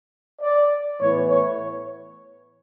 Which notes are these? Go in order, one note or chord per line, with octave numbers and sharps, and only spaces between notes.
D5
A2 E3 B3 C#5
C#5